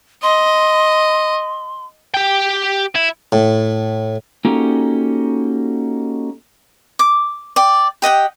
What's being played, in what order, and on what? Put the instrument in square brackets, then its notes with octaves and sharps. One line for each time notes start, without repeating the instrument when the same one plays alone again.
[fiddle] D#5 [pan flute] C6
[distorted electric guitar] G4 G5
E4
[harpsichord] A2
[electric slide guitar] A#3 C#4 D#4 F#4 G4 A4
[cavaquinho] D6
D5 G5
G4 D#5 F#5 G5